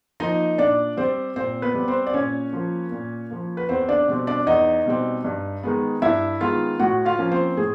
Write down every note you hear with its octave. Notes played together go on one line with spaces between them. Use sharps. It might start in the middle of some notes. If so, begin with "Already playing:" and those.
F3 A#3 D#4 D#5
A#2 D4 D5
G3 C4 C5
A#2 C4 C5
B3 B4
G3 C4
C4 C5
D5
A#2 C#4 C#5
F3 A#3
A#2
F3 A#3
B4
E2 C4 C5
D4 D5
B2 G3 C4
D4 D5
E2 D#4 D#5
B2 G3 C4
G2
D#3 G#3 B3
G2 E4 E5
D#3 G#3 B3 F4 F5
A2 F#4 F#5
F4 F5
F3 A#3 C#4
C4 C5
A2 G#4